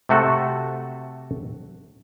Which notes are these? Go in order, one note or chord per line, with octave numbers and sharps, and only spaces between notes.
C3 A3 F#4 A4